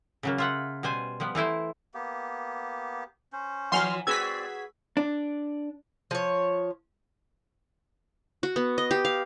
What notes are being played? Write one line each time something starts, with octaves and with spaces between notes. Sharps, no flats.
C#3 F#3 A#3
F4 E5 F#5
B2 G3 C5 G#5
F3 G3 B3
E3 A3 E4 C5
A#3 B3 G4
C#4 C5
E3 F3 F#5 G#5 A#5 C6 F6
C4 F#4 G#4 B4 D5 E6 G#6 B6
D4
F3 C#5
F#4
B3
D#5
G4
F5